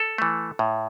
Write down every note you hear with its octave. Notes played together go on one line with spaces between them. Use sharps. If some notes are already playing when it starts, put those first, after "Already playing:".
Already playing: A4
E3 A3
A2